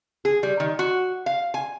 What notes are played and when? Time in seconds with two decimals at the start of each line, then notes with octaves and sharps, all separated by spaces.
0.25 G#4
0.43 G3
0.60 D#3
0.79 F#4
1.26 F5
1.54 G#5